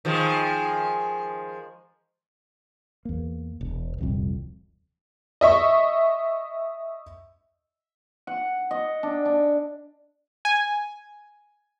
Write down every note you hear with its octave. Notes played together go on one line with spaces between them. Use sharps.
D#3 F3 G#3
E2 A#3
E1
D#1 C2 F2
D#5 E5 C#6
F#5
D#5
D4
D4
G#5